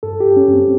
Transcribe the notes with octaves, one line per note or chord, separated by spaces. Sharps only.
G2 A4
G4
G2
C#4
G2
C4